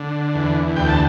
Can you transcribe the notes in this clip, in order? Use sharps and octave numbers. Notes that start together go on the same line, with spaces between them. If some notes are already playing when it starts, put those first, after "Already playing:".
Already playing: D3
E2
D2 G5
A5